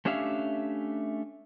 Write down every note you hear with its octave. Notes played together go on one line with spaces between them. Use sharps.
A3 C#4 D4 G4 E5 F5